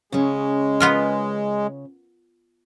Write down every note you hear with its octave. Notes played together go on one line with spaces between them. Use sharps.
C#3 G#3 C#4
B3 F4 A#4